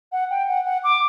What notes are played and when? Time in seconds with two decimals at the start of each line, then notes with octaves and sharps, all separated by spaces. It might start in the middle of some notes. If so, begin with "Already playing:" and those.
0.12 F#5
0.30 G5
0.49 F#5
0.65 F#5
0.84 D6